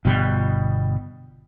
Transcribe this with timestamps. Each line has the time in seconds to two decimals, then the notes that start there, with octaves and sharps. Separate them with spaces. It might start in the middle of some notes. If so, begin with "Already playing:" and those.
0.05 G1 B2 G3